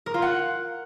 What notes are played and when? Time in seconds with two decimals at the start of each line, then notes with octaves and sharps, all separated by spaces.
0.06 A#4
0.14 F4
0.22 F#5